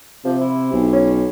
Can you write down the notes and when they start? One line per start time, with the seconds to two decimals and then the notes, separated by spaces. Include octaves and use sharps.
0.25 C3 F3
0.41 E4
0.72 B1
0.93 C#4